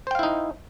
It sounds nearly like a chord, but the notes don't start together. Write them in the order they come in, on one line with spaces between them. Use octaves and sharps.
C5 G5 F5 E4 D#4